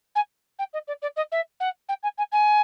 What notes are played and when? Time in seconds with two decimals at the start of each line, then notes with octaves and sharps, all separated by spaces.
0.15 G#5
0.59 G5
0.73 D#5
0.87 D5
1.02 D5
1.16 D#5
1.32 E5
1.60 F#5
1.89 G5
2.03 G#5
2.18 G#5
2.32 G#5